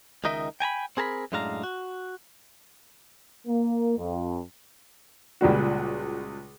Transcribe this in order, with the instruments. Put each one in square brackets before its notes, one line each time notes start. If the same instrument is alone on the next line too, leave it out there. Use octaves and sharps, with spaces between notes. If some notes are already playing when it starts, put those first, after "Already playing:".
[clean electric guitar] C#2 D#3 D#4 A#4 D#5 E5
G5 G#5 A#5 B5
C4 G#4 A#4 A5 B5
F#2 A2 G#3 D4 F5 A#5
F#4
[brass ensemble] A#3
F2
[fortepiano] C#2 A#2 G3 F#4